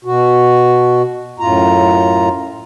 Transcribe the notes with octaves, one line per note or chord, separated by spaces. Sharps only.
B2 F#4
F#2 A2 F4 A#5